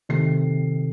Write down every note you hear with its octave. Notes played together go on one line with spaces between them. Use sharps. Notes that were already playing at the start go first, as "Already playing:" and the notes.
C3 D#3 A3 C7